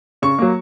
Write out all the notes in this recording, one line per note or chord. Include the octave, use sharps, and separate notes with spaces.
C#3 C#6
F#3 A#3